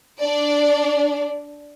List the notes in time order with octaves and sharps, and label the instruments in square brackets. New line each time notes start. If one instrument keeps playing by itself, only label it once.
[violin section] D4 D5